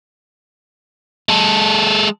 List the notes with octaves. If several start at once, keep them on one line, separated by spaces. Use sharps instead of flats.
G#3 A4